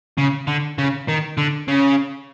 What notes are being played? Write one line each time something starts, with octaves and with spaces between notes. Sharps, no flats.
C#3
D3
C#3
D#3
D3
C#3